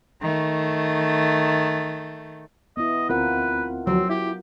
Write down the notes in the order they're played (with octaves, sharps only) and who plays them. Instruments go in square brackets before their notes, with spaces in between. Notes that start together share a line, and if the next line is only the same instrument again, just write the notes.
[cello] D#3 A3
[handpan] B3 E4 [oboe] D#5
[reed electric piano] D2 C4 [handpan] F4 A#4 F#5 [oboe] B4
[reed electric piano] D2 F3 [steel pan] F#3 [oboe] C4
[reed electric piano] E4 [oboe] G4